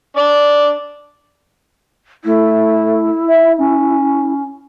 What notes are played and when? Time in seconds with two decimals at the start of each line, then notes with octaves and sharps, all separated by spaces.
0.17 D4 D5
2.25 A3 E4
3.28 E5
3.58 C#4